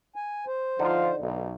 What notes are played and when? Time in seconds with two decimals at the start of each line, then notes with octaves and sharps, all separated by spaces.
0.15 G#5
0.47 C5
0.79 D3 F3 D#4 F4
1.20 B1